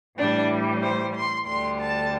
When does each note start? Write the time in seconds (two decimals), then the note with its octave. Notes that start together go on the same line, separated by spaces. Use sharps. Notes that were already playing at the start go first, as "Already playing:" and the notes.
0.18 A2 E3 G3 D4
0.83 C5
1.16 C6
1.48 D2 D3 G3 C6
1.81 A5